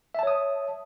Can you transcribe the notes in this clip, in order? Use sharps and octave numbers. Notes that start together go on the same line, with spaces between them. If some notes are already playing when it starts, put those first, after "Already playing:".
C#5 E5 A5 D#6